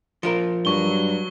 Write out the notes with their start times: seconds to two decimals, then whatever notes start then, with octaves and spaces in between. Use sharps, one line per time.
0.23 F3 F4 A#4
0.65 G2 F#3 C#6 G7